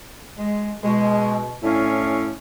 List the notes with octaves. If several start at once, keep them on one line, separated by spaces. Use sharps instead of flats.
G#3
B2 G#3
A2 C#4 D4 E4 F5 G#5